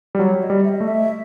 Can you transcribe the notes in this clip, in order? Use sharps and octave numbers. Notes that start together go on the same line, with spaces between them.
G3
F#3 C#5
D#5
G3
E5
D#5
A3
E5